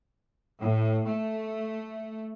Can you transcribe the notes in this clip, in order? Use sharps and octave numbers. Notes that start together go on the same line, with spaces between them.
A2
A3